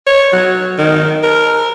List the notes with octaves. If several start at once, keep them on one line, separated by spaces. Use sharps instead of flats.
C#5
F#3
D#3
A#4